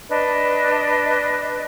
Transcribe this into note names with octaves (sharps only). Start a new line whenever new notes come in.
D4 B4 D#5